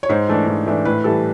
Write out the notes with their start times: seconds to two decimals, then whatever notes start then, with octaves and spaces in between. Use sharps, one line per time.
0.03 C#5
0.09 G#2 C5
0.28 E3 A3 D4
0.47 G#2
0.66 E3 A3 D4
0.85 A2 B4
1.04 E3 G3 A4